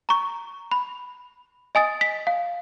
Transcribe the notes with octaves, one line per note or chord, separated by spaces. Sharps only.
A#5 C#6
B5
D#5 G#5 D#6 A6
B6
F5